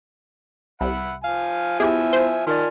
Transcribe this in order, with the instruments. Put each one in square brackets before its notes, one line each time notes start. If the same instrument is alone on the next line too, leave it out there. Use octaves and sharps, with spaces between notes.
[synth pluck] C2 [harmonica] E5 F#5 B5
[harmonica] F3 G#5 [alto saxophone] F5
[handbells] B3 E4 [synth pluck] G4 G#4 [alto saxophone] E5
[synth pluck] C5
[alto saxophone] D#3 [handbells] F4 A#4 D5 [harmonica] G#5 A5 F6